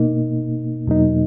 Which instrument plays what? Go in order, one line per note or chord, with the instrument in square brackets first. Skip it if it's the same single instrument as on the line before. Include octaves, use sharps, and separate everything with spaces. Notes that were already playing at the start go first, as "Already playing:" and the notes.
Already playing: [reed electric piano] B2 A#3 D#4
E2 B2 F#3 A#3 D#4